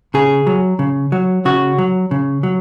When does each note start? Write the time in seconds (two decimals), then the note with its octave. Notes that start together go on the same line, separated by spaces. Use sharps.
0.14 C#3 G#4
0.47 F#3
0.79 C#3
1.12 F#3
1.45 C#3 F#4
1.78 F#3
2.11 C#3
2.43 F#3